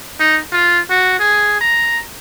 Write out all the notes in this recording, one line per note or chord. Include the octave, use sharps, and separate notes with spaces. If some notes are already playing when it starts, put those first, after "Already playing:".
D#4
F4
F#4
G#4
A#5